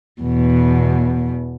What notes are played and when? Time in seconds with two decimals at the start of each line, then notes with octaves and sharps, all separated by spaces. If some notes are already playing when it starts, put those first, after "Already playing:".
0.21 E2 B2